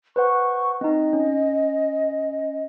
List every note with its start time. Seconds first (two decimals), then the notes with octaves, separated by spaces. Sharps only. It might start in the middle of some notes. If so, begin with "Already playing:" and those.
0.16 B4 C5 F#5 C#6
0.81 C4 D#4 D#5
1.13 C#4